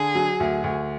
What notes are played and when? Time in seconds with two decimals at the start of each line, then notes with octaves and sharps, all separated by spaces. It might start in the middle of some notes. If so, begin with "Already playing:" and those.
Already playing: D3 G#4
0.15 F#3
0.40 D2
0.64 D2